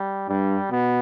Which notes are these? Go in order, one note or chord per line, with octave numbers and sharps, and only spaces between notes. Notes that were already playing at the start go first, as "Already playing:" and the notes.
Already playing: G3
G2 G3
B2 B3